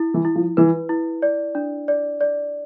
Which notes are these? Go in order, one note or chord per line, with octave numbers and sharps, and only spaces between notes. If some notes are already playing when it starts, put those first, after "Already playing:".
Already playing: E4
E3
E4
F3
E3 B4
E4
D5
D4
D5
D5